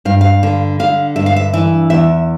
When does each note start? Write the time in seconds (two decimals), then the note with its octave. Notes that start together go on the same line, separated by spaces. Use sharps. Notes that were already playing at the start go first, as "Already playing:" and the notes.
0.05 G2 F5
0.21 F5
0.43 D3
0.80 D3 F5
1.16 G2 E5
1.26 F5
1.36 E5
1.53 E3 E5
1.90 E2 E5